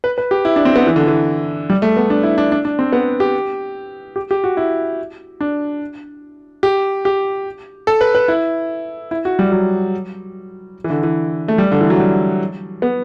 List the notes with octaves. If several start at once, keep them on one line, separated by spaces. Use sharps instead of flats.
B4
B4
G4
E4
D4
C4
B3
E3
D3
E3
G3
A3
B3
D4
E4
D4
D4
D4
C4
B3
G4
G4
G4
F#4
E4
D4
G4
G4
A4
B4
B4
E4
E4
F#4
G3
F#3
E3
D3
E3
A3
G3
D3
E3
F#3
G3
B3